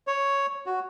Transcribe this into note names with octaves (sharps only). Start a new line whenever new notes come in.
C#5
F#4